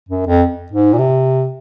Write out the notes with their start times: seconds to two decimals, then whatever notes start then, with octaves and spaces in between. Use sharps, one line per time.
0.09 F#2
0.27 F2
0.72 G#2
0.94 A#2
0.98 C3